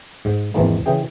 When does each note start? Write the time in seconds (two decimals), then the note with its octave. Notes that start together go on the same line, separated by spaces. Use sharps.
0.25 G#2
0.54 G#1 E2 E3 F3 G#3 A#3
0.86 C#3 E3 G#4 G5